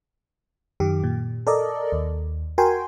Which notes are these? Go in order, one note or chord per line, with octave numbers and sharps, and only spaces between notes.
F#2 D#3 G4
A#2
A4 A#4 D5 D#5
D#2
F#4 A#4 G5 G#5 C6